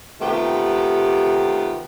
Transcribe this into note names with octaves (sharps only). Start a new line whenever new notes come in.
C3 D#3 A3 B3 F4 G4